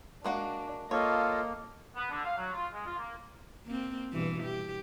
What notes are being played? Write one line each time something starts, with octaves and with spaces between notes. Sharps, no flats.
G#3 A#3 D4 F#4
A#3 F4 A4 C#5 D#5
B3
D3
F5
F#3
F4
G#3
F4
A#3
A#3 C4
G2 B2 E3
G4